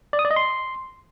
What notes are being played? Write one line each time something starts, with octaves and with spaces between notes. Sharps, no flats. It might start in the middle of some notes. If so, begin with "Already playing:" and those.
D5
D#6
D5
D#5
C6